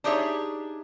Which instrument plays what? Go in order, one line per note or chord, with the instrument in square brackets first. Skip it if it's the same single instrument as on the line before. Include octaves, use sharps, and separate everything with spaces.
[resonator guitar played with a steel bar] D4 D#4 G4 G#4 C#5 E5